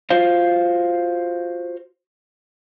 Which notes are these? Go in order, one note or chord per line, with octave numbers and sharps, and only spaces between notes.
F4 F#4 C5 F5